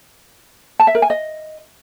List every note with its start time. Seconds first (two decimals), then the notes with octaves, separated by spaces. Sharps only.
0.80 A5
0.87 E5
0.95 A#4
1.02 G#5
1.10 D#5